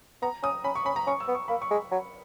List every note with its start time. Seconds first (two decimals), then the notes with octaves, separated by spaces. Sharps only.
0.22 B3 A#5
0.43 C#4 D#6
0.64 C#4 B5
0.75 C#6
0.85 C#4 B5
0.96 A#5
1.07 C#4 C#6
1.20 E6
1.28 B3
1.35 C#6
1.48 A#3 B5
1.62 C#6
1.71 G#3
1.91 F#3